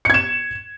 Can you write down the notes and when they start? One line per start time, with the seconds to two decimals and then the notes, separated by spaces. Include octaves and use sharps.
0.05 C#7
0.10 G#6
0.14 E7